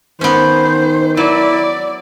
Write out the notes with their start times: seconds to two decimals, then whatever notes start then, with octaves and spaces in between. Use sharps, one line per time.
0.21 D#3 B3 C#4 C5
1.17 F#3 E4 D5